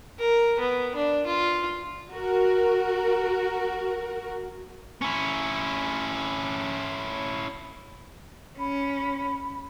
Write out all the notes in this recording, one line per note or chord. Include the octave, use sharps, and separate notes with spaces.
A#4
B3
D4
F4
F#4 A#4
C#4 E4
C#4 B5